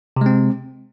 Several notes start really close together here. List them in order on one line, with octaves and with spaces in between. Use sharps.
C3 G#3 C4